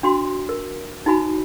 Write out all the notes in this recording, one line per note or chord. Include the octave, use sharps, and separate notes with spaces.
D4 F#4 C6
A#4
D#4 E4 F#4 G#5 B5